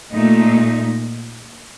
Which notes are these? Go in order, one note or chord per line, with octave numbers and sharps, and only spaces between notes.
A#2 A3 D#4